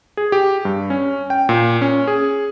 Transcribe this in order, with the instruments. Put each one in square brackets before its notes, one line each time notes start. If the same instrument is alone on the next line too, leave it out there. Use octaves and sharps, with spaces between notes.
[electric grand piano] G#4
G4
G2
C#4
G5
A#2
C#4
G#4